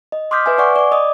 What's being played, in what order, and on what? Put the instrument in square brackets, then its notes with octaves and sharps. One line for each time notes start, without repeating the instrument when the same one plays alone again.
[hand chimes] D#5
C6 D6 D#6 F6 G6 B6
B4 E5 G#5
D5 F#5 G#5 C#6 D6
D5 D6
D#5 D#6